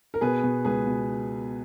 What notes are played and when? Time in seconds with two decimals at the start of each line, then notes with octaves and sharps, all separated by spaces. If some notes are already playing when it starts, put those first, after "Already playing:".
0.14 A#4
0.21 B2 G#4 B4
0.43 B2
0.65 C#2 G#4 B4
0.87 B2